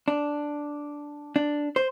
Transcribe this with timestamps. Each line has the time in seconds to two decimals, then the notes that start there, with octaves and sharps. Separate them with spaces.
0.08 D4
1.36 D4
1.76 C5